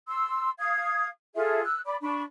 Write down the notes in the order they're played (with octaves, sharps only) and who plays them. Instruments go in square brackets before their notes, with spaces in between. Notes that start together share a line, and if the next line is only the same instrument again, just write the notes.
[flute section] C6 E6
F5 D#6 G#6
F4 G#4 A4 E5
E6 F#6
D5 B5 D6
D4 B5 C#6